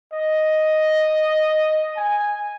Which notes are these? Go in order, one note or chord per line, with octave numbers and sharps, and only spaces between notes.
D#5
G#5